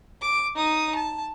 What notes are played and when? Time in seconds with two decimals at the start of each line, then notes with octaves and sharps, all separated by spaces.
0.22 D6
0.55 D#4 D#6
0.95 A5